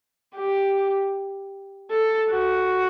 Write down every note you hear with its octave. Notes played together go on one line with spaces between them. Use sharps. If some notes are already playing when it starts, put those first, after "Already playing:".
G4
A4
F#4